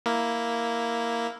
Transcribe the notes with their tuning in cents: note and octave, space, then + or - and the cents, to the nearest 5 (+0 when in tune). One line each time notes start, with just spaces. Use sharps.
A#3 +0 E4 +0